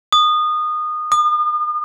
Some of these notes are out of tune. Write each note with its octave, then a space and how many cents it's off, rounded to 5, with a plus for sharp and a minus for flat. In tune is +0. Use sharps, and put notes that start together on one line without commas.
D#6 -20
D#6 -40